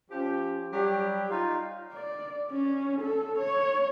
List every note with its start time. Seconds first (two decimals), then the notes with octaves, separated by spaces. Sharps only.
0.10 F3 C#4 G4
0.72 F#3 G3 G4
1.30 D#4 F4
1.93 D5
2.51 C#4
3.02 A4
3.39 C#5